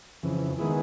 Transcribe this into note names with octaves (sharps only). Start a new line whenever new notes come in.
F2 C#3 E3
D#3 G#3 B3 E4 G#4